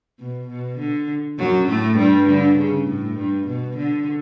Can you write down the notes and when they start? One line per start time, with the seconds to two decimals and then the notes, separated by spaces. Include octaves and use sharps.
0.19 B2
0.49 B2
0.79 D3
1.39 F#2 F#3
1.69 A2 A3
1.98 G2 G3
2.28 D3
2.58 C#3
2.88 A2
3.18 G2
3.48 B2
3.77 D3